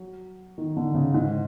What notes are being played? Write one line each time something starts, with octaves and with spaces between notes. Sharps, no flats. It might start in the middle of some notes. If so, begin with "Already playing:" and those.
Already playing: F#3
D#3
D3
C#3
G#2